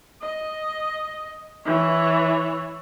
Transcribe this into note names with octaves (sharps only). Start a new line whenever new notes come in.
D#5
E3 C#5